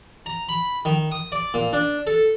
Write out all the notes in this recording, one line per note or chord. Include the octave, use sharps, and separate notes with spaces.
A#5
B5
D#3
D#6
D5
A#2
D4
A4